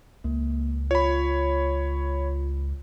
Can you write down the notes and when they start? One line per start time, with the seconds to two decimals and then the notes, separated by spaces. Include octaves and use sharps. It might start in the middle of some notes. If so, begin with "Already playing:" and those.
0.24 C#2 A#3
0.91 F4 C#5 B5